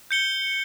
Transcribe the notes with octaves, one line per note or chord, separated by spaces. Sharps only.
G6 C#7 G7